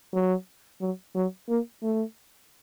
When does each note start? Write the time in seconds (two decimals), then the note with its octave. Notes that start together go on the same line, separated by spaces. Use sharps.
0.14 F#3
0.81 F#3
1.15 F#3
1.49 A#3
1.82 A3